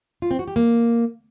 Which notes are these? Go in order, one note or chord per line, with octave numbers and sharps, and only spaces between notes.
F4
C4
F#4
G4
A#3